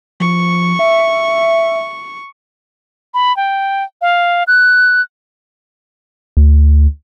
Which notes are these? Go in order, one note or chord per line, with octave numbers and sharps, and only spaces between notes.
F3 C#6
E5
B5
G5
F5
F#6
D2